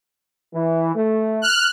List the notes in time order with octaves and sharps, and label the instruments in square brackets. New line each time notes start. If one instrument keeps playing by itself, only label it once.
[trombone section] E3
A3
[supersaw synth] F6 F#6